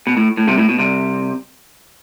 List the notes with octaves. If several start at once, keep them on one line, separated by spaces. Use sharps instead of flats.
B2
A2
A2
C2 C3
A2
B2
C2 C3